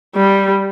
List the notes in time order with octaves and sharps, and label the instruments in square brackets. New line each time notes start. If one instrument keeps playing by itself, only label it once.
[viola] G3